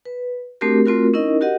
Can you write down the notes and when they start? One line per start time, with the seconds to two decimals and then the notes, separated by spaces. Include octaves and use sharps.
0.05 B4
0.61 A3 C4 D4 F#4 G4 A#4
0.86 A3 C4 F4 F#4 A#4
1.14 C#4 D#4 E4 A#4 D#5
1.41 F#4 G4 A#4 D#5 F#5